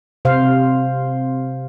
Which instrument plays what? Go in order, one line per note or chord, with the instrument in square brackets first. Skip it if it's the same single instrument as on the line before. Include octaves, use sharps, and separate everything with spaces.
[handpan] C3 C5 F5